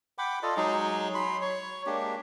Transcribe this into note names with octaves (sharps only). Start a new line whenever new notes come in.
F#5 G5 B5 D6
F4 A4 D5 D#5
F#3 G#3 D#4 G#4
F#3 B5 C6
C#5
G#3 A#3 D4 G4